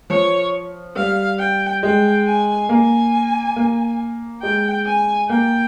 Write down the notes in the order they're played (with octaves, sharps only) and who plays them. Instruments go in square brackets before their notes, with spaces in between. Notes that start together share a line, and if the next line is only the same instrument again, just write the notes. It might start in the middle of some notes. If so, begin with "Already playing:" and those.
[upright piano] F3 [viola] C#5
[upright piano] G3 [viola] F5
[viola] G5
[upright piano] G#3 [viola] G5
[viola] G#5
[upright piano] A#3 [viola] G#5
[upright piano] A#3
[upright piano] G#3 [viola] G5
[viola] G#5
[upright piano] A#3 [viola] G5